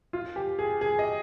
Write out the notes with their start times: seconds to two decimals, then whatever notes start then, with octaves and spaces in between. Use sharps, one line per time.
0.13 F4
0.36 G4
0.59 G#4
0.81 G#4
0.99 D#5